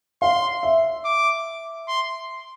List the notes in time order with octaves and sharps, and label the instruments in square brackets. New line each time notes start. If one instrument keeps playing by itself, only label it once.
[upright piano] F5 [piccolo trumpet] C6
[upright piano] E5
[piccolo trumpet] D6
C6